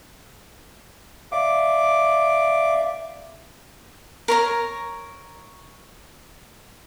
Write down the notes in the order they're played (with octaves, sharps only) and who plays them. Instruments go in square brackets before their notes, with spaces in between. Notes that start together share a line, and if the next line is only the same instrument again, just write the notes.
[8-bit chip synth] D5 E5 F5 [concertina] D6
[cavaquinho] A#4 C#5 A#5